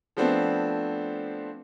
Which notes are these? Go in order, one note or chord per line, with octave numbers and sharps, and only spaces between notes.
F3 A3 B3 C4 D4